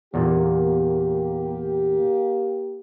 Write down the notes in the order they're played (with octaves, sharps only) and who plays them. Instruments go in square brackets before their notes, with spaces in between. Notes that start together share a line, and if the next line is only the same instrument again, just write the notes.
[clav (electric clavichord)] E2 A#2 [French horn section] A#3 G4